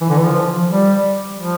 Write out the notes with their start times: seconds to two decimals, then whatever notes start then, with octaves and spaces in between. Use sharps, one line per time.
0.01 E3
0.09 D3
0.18 E3
0.26 F3
0.70 G3
1.39 F3